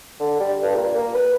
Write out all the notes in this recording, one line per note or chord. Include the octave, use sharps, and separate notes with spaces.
D3
G3
G2
A#2
A#3
B4